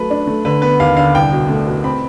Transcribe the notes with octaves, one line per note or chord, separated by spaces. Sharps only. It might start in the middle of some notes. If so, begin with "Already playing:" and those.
Already playing: F#3 A3 B4
D4
A3
D3 B4
B3 B4
D#2 F5
D3 F5
C2 G5
B2
A3
B2
C4 B5